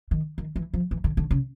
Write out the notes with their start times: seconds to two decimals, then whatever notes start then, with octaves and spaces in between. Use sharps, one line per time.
0.11 D#3
0.38 D#3
0.56 E3
0.74 F3
0.91 E3
1.04 D3
1.17 D3
1.31 C#3